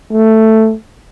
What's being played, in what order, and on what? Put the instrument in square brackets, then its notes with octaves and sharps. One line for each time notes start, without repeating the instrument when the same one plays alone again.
[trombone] A3